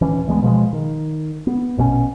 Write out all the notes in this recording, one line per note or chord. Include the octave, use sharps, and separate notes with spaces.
D#1 E3 C#4
D2 E3 G#3 B3
B2 F3 G#3
D#3
B3
A#1 B2 F3 C#4